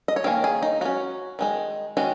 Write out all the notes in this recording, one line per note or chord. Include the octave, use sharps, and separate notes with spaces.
D#5
C#5
D#3 A#3 C#4 A#4
G#4
D#4
F#3 C#4 F#4
D#3 G#3 D#4
D#3 G#3 C#4 F#4